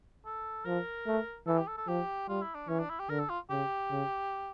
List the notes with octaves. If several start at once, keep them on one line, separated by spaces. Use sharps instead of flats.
A4
F3 A#4
A3
E3 A4
G4
A4
A4
F3 G4
G3 F4
E4
D4
E3 C#4
D4
E4
G4
D3 A#4
A4
F4
C#3 G4
C#3